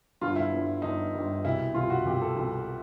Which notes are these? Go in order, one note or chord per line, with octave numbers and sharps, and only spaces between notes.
G1 G2 D3 F4
E4
G1 G2 D3
G1 G2 D3 D#4
G1 G2 D3
C2 B2 E4
C2 B2 F4
F#4
C2 B2 G4
A4
C2 B2